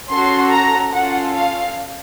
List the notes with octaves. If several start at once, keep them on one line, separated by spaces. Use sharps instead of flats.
C#4 F#4 A4 C6
A#5
C#4 F4 A4 F#5
F5